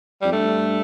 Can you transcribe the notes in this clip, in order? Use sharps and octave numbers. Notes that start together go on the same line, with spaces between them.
F2 G3
G2 A3